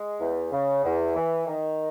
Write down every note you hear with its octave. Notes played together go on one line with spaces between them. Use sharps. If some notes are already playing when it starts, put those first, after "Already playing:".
Already playing: G#3
E2
C#3
E2
E3
D#3